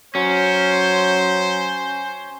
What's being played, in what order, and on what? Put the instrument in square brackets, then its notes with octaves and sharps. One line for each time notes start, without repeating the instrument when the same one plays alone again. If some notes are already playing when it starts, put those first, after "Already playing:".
[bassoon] F#3 [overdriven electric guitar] C#4 [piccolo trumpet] C5